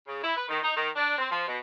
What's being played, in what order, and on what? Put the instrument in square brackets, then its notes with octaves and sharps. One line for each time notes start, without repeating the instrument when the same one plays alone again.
[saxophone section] C#3
E4
B4
D#3
D#4
D#3
D4
C4
F3
B2